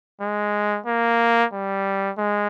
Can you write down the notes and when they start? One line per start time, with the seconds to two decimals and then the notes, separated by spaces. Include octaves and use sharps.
0.21 G#3
0.86 A#3
1.52 G3
2.18 G#3